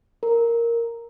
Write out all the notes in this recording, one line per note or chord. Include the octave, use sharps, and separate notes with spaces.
A#4